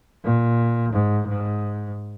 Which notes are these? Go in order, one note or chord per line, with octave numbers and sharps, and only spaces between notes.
A#2
G#2
G#2